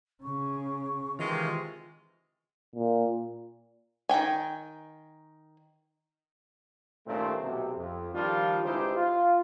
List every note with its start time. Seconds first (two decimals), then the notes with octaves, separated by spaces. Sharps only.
0.23 C#3 C#6
1.19 C3 D#3 E3 G#3 F4
2.75 A#2
4.09 D#3 F#3 G5 G#5
7.07 G2 A#2 D#3 A3 C4 C#4
7.41 B1 C3
7.76 F2
8.13 D#3 F3 G3 D4 F4
8.64 C#2 G#3 D#4 E4 G4 C5
8.96 F4